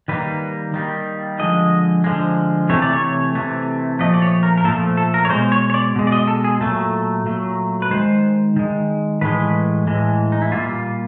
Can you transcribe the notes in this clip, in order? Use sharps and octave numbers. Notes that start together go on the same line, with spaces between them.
D#3 G3 A#3 B4
D#3 G3 A#3
D3 F3 G#3 D#5
D3 F3 G#3
C3 E3 A3 C#5
D5
C#5
C3 E3 A3
A#2 F3 A3 D#5
D5
C#5
A#4
A#4
A#2 F3 A3 A4
A4
A#4
C#5
B2 G#3 C5
C#5
C#5
D5
B2 G#3
D5
D#5
A4
G#4
A#2 F#3 A3 A4
A#2 F#3 A3
B4
D#3 G#3 C5
D#3 G#3
A2 E3 G#3 B4
A2 E3 G#3
D#4
E4
A#2 G3 A#3 F4